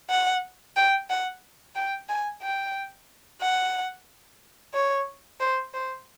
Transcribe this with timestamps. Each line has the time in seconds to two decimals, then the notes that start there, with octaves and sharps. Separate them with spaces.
0.10 F#5
0.76 G5
1.10 F#5
1.76 G5
2.09 G#5
2.42 G5
3.41 F#5
4.74 C#5
5.40 C5
5.74 C5